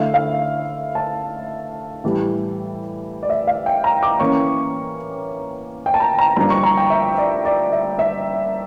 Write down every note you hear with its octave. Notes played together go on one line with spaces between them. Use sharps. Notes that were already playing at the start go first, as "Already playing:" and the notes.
Already playing: D3 A3 E4 F5
F5
A5
A2 E3 G3
D5
E5
F5
G5
A#5
D6
E3 A#3 C#4 C#6
G5
A5
A#5
A#5
G2 F3 A#3 D4 F4 A#5
C#6
A#5
G5
E5
D5
D5
E5
E5